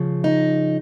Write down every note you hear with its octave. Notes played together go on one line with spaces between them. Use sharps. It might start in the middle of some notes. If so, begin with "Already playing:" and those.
Already playing: C#3 F3
D#4